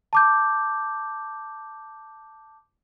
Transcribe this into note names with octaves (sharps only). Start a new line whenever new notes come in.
A5 D6 G6